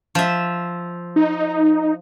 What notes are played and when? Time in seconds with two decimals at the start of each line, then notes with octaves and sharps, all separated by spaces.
0.15 F3 E5
1.16 D#4